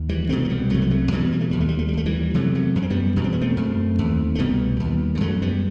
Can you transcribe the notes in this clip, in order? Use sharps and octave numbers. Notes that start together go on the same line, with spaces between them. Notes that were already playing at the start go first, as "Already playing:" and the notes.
Already playing: D#2
E3 G3
C2 B2 A3 C4
A3
G3 B3
C2 C3 F#3 A3
B3
F#3 A3
E2 B2 E3 G3
G3
A3
D#2 G3
A3
G3
A3
G3
D#2 A3
E3 G3
E2 C3 F#3 A3
F#3 A3
F#2 B3
C4
G3 B3
E2 B2
C4
B3
A3 C4
F#2
D#2
A3
C2 B2 G3 B3
D#2
G3
F#2 F#3 A3
G3 B3